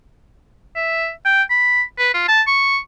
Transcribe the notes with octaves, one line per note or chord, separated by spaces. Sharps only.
E5
G5
B5
B4
F4
A5
C#6